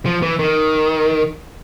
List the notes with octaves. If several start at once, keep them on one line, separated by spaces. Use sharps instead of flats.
F3
E3
D#3